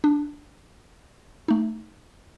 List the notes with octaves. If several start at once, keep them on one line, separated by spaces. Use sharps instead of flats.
D4
A3 D#4